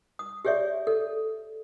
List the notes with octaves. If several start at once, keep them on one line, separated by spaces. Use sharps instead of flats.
D#6
G4 G#4 C#5 D5 E5
A4